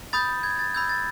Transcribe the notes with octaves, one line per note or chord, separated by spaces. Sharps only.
B5 D#6 G6 A6
G#6
A6
B5 E6 G6 G#6
A6